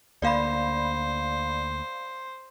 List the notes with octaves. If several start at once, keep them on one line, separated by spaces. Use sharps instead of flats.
D2 A#3 C5 D5 F5 B5